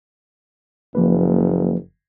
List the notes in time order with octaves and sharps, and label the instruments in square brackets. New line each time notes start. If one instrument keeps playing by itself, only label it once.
[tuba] F#1 [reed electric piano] F3 A#3 B4